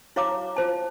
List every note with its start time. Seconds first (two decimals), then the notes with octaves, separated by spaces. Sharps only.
0.16 E4 F#4 C#5 F5 A#5 D6
0.56 F4 C5 A5